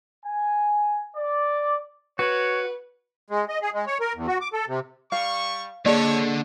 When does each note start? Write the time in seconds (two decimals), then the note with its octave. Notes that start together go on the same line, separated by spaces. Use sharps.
0.25 G#5
1.17 D5
2.19 F#4 B4 C#5
3.30 G#3
3.48 D#5
3.62 G#4
3.74 G#3
3.87 C#5
4.00 A#4
4.15 E2
4.27 F#4
4.41 D6
4.53 A4
4.68 C3
5.12 G3 F5 C#6
5.86 D3 A#3 G#4 A4 C#5 D5